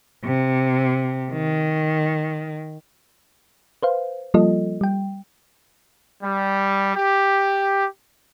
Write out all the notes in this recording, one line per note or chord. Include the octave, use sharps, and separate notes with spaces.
C3
D#3
B4 C5 F5
F3 G3 A#3 F4 A4 D#5
G3 G5
G3
G4